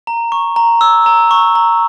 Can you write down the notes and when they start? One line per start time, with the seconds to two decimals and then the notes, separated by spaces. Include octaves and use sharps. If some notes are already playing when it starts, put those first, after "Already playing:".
0.07 A#5
0.32 C#6
0.56 A#5
0.81 E6
1.06 A#5
1.31 C#6
1.55 A#5